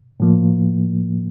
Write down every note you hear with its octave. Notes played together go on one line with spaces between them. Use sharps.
A2 F3 A#3